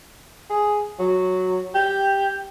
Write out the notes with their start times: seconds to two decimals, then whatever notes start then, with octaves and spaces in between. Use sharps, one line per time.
0.50 G#4
0.99 F#3
1.75 G4